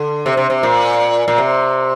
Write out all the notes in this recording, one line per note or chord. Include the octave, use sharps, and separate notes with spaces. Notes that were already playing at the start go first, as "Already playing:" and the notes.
Already playing: D3
C3
C3
C3
A#2
A#2
C3